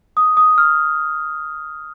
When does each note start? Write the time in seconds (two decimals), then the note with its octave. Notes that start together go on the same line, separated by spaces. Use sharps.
0.17 D#6
0.37 D#6
0.58 F6